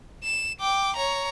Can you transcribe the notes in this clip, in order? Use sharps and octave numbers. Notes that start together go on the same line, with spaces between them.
E7
G5 D6
C#5 A#5